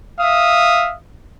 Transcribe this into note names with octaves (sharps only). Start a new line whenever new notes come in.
E5 F5 D#6